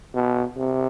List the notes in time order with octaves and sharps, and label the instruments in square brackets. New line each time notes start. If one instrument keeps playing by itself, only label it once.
[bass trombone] B2
C3